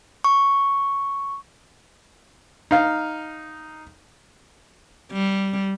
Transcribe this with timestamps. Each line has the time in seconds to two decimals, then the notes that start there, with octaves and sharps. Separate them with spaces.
0.24 C#6
2.71 D#4 F5
5.13 G3